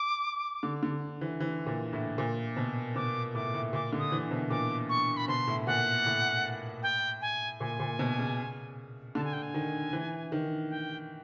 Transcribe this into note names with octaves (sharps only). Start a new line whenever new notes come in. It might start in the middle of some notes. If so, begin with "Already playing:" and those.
Already playing: D6
D3
D3
E3
E3
A#2
A2
A#2
B2
B2 D6
A2 D6
A2
A#2 D6
D3
D#6
E3
B2
A#2 D6
C#6
B5
B2 C6
A2
A#2 F#5
A2
G5
G#5
A#2 G#5
A#2
B2
C#3
D3 A5
G#5
G5
G#5
D#3
E3
D#3
G5